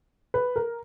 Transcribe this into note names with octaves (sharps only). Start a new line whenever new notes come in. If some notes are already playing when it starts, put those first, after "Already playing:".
B4
A#4